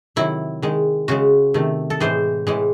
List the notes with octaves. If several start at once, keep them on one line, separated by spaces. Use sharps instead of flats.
C3 D#3 F#3 E4
D#3 G#3
C#3 G#3 F#4
C3 D#3 A3
A4
A2 E3 G#3 C5
A2 E3 G#3